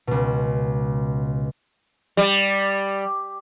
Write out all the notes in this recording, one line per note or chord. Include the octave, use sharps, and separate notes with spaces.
C#2 B2
G3